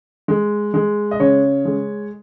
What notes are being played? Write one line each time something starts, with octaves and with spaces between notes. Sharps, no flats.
G#3
G#3
D#5
C#3 C#5
G#3